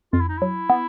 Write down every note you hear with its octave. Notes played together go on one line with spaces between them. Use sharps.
F2 F4
E4
D#4
F#3 E4
B3